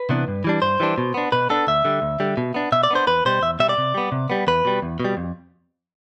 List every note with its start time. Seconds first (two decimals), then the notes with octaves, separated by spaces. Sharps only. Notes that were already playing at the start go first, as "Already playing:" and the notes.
Already playing: B4
0.09 C3 E3 B3 D4
0.28 G2
0.44 E3 G3 D4
0.62 G2 C5
0.80 E3 G3 D4
0.98 B2
1.14 B3 D4
1.32 B2 B4
1.50 B3 D4 A4
1.67 D2 E5
1.85 D3 G3
2.02 D2
2.20 D3 G3
2.37 B2
2.54 B3 D4
2.72 B2 E5
2.83 D5
2.90 B3 D4 C5
3.07 E2 B4
3.25 B2 G3 C5
3.42 E2 E5
3.59 B2 G3 E5
3.69 D5
3.78 C3
3.94 G3 B3
4.12 C3
4.30 G3 B3
4.47 E2 B4
4.65 B2 G3
4.82 E2
5.00 B2 G3
5.17 F2